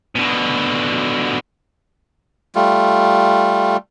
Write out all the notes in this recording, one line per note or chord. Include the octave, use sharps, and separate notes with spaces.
B2 D3
G3 A3 F4